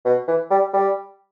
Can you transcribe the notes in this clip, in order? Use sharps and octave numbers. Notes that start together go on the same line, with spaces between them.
B2
E3
G3
G3